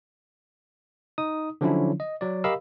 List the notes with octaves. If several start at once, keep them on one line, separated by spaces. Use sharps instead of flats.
D#4 D#6
D3 F3 F#3 C#4 D4 E4
D#5
F#3 D5
G4 A#4 D#5 F5 B5 E6